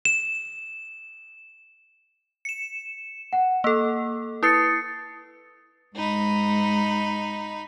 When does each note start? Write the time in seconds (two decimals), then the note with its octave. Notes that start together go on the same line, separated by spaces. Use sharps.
0.05 E7
2.45 C#7 E7
3.33 F#5
3.64 A#3 A4 E6
4.43 E4 B4 D#6 A6 C7 C#7
5.96 G#2 D#4 B5